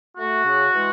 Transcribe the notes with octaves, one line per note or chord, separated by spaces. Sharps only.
A3 F#4
C#3
E3 G#3